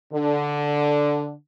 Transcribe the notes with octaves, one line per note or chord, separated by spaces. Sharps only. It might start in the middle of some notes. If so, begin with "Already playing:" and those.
D3